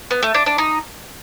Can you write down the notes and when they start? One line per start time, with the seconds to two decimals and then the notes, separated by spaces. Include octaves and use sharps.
0.11 B3
0.23 A3
0.34 D4
0.46 D4
0.58 D#4